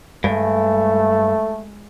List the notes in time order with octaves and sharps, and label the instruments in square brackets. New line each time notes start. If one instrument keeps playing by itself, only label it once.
[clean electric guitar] G2 [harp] G#3 [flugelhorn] A3